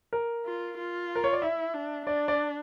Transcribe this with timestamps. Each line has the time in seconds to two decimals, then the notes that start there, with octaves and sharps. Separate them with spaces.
0.13 A#4
0.46 F4
0.77 F4
1.15 A#4
1.24 C#5
1.33 D5
1.42 E4 E5
1.74 D4
2.06 D4 D5
2.28 D5